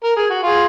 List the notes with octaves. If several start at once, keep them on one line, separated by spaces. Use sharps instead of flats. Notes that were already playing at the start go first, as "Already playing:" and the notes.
A#4
G#4
F#4
F4 G#4